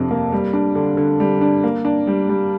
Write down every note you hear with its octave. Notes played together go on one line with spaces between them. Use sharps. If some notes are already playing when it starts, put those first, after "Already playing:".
Already playing: F2 C3 D4
A#3
G3
D4
D3
D3
G3
D4
A#3
D4
G3
G3